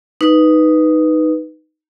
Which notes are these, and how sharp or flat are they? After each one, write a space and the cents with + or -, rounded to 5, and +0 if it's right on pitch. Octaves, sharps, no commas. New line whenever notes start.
D#4 +0 B4 +0